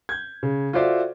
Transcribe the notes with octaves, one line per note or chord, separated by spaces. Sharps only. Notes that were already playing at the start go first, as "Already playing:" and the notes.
G6 G#6
C#3
F4 F#4 A4 C5 D5 E5